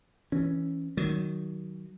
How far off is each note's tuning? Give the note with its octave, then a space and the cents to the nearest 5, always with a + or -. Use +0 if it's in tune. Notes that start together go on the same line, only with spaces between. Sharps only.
E3 +0 C#4 +0
D#3 +0 F#3 +15